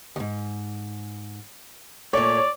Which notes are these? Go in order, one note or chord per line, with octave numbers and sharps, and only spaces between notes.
D2 G#2
A#2 A3 C#5 D5